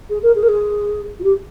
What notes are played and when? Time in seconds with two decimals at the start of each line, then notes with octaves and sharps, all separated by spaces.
0.09 G#4
0.22 A#4
0.35 G#4
0.43 A#4
0.48 G#4
1.19 F4
1.23 G4